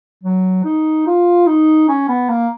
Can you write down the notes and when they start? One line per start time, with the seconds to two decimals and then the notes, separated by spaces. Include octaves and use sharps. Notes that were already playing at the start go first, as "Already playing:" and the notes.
0.24 F#3
0.64 D#4
1.07 F4
1.47 D#4
1.88 C#4
2.08 B3
2.29 A#3